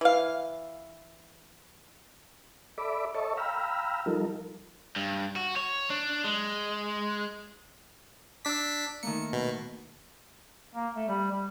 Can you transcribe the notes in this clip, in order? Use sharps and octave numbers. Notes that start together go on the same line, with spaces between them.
E3 F5
A4 D5 E5 B5 D6
A4 C#5 D#5 E5 A5 C#6
F5 G5 A#5 B5 E6 F6
F3 G3 D#4 F4 A4 A#4
G2
F#4
C#5
D4
G#3
D4 D6 E6 B6
D#3 A3 A#3 C#7
B2
A#3
A3
G3
G3